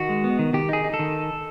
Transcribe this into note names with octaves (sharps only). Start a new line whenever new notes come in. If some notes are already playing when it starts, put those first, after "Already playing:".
Already playing: D#3 F#4
G#3
B3
D#3
D#3 G4
D#4 G#4
D#4
A4
D#3